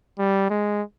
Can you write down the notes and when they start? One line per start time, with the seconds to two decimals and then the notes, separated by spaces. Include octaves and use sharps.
0.19 G3
0.50 G#3